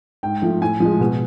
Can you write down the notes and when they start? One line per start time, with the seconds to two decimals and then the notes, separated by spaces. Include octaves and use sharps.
0.23 G#2 G5
0.42 F3 A3
0.61 A2 G#5
0.80 F3 G#3
1.00 B2